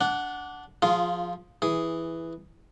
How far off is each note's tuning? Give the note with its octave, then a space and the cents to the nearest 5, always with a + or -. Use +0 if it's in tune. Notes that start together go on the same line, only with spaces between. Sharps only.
D4 -15 F#5 +0
F3 +15 F4 -10 G#4 +0
E3 +0 G#4 +0